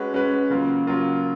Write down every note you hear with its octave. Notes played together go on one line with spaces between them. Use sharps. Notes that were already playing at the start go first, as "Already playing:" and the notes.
Already playing: G#3 C#4 F#4 B4
G#3 C#4 F#4 B4
C#3 F#3 A#3 F4 A#4
C#3 F#3 A#3 F4 A#4